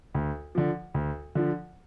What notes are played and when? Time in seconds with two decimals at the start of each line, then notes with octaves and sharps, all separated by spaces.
0.14 D2
0.55 D3 F3
0.94 D2
1.35 D3 F3